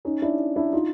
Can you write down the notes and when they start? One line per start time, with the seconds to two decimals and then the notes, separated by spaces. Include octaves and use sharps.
0.05 C#4 D#4
0.22 D4 E4
0.56 D4 E4
0.73 D#4 F4